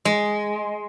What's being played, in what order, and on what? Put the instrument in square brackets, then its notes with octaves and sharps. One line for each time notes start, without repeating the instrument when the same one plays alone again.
[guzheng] G#3